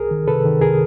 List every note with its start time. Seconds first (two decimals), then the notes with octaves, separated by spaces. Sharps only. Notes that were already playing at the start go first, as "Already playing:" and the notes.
Already playing: C2 G#4 A#4
0.11 D#3
0.27 C3 A4 B4
0.45 D#3
0.61 C2 G#4 A#4